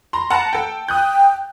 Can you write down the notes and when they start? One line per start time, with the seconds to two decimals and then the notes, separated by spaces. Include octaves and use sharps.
0.13 A#5 C6
0.30 F#5 A5 A#5
0.53 A4 G5
0.88 G5 D#6 F#6 G6